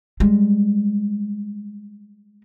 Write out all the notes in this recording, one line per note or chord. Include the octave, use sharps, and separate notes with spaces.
G3 G#3